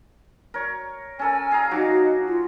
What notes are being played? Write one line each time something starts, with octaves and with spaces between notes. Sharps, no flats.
A#4 C#5
C#4 A4 A#4 G#5
G#4 F5 A#5
F#3 D#4 F#4 D6
F4